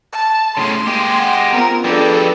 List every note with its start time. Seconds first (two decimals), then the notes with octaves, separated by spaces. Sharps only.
0.12 A5
0.57 A2 C#3 C6
0.86 G#3 A#3 G4
1.19 F#5
1.53 B3 C4 F4 A#4
1.84 F2 G3 D4 G#4 A4 B4 D5